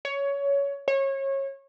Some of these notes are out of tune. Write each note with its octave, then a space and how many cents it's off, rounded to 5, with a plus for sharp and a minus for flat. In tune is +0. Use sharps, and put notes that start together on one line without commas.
C#5 +15
C#5 -25